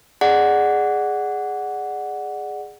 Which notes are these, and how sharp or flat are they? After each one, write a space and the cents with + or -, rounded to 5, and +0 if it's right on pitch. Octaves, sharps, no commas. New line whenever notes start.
G#4 +0 D5 +25 F#5 +0